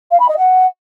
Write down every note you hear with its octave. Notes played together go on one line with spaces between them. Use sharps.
F5
B5
D#5
F#5